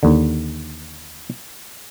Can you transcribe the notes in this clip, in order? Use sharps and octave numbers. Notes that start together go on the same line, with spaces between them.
D#2 D3